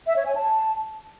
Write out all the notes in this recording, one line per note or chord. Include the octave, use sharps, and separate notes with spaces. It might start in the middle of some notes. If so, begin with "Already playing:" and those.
E5
C#5
G#5
A5